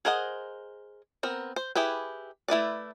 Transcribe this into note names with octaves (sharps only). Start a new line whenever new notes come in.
G#4 A#4 C5 D#5 F#5
B3 C4 A#4
C5
E4 G4 G#4 B4
A3 E4 B4 D5